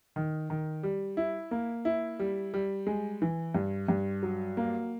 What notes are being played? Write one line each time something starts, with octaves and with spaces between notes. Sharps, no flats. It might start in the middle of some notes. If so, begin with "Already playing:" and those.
D#3
D#3
G3
E4
A#3
E4
G3
G3
G#3
E3
G2
G2
F#3
A#3